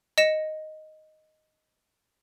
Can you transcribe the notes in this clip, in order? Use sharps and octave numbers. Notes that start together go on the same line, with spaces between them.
D#5 A#6 C#7 E7